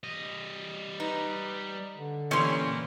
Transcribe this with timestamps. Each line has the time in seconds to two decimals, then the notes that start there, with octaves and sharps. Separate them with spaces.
0.04 G3 D#5
1.00 D#4 B4
1.97 D3
2.31 A#2 E3 G3 C#4 C6